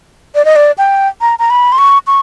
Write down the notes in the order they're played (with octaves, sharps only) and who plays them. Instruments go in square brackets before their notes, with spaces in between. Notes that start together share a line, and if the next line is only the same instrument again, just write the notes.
[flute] D5
D#5
D5
G5
A#5
A#5
B5
C6
C#6
C#6